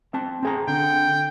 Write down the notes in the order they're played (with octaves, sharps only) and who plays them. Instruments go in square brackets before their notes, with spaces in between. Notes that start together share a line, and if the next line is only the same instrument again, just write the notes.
[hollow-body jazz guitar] C4 A5
C4 G#4 A#5
[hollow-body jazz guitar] D3 [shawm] G5